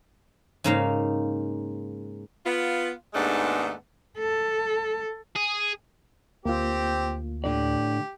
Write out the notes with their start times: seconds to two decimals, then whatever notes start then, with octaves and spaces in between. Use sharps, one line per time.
0.64 G#2 C#3 A#3 D#4 F5
2.45 B3 F4
3.14 D#2 G#2 G#3 A3 B3 D4
4.18 A4
5.36 G#4
6.45 D2 A#3 C4 F4 G4
7.44 A2 D3 G4 D5